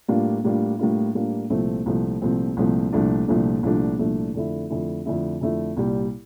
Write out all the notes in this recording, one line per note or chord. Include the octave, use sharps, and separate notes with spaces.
A2 G3 A#3 D4 F4
A2 G3 A#3 D4 F4
A2 G3 A#3 D4 F4
A2 G3 A#3 D4 F4
C2 A#2 F3 A3 C4
C2 A#2 F3 A3 C4
C2 A#2 F3 A3 C4
C2 A#2 F3 A3 C4
C2 A#2 F3 A3 D4
C2 A#2 F3 A3 D4
C2 A#2 F3 A3 D4
C2 A#2 F3 A3 D4
F2 D3 A3 E4
F2 D3 A3 E4
F2 D3 A3 E4
F2 D3 A3 E4
C2 A#2 G3